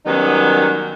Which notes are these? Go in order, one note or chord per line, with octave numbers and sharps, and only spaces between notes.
D#3 F#3 G3 B3 C#4 D#4